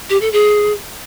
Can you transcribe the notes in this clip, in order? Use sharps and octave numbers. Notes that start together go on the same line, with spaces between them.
G4
A4
G#4